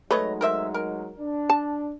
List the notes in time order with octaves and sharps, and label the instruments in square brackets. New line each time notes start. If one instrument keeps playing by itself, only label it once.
[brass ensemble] F#3 G#3 D#4 [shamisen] A3 [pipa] B4 C#5 D#5
[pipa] A#4 C5 E5
A#4
[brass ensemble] D4
[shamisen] A5